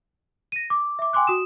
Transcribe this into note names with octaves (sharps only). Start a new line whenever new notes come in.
A#6 D#7
D6
E5 D6
G5 G#5 C6 D6 F#6
F#4 D#6 E7